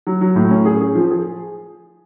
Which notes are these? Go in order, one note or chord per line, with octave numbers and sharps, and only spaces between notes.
F#3
F#3
A2
C#4
G#4
G#4
F3
G#4